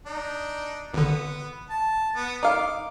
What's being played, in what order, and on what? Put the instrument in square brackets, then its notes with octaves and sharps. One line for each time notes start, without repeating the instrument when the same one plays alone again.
[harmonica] D4 D#4
[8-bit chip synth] G#1 D3 [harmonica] B3
[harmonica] A5
B3
[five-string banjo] D#4 F5 [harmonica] D6